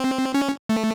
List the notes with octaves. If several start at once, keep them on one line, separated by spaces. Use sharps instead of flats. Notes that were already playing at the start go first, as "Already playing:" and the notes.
Already playing: C4
C#4
A3